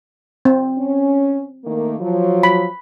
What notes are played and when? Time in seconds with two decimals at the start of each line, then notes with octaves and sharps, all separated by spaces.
0.45 C4
0.78 C#4
1.65 D#3 A3 A#3
2.00 F3 F#3
2.43 B5